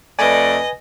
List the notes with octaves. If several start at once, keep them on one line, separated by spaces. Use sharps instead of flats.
F2 A3 B4 D5 D#5 G#5